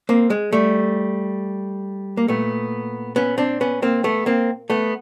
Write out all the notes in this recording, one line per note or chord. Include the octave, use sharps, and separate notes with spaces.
A#3 C4
G#3
G3 A3
A#3
A#2 A3 B3
B3 C#4
C4 D4
B3 C#4
A#3 C4
A3 B3
A#3 C4
A3 B3